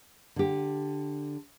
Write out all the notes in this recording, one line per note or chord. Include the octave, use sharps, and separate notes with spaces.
D3 G4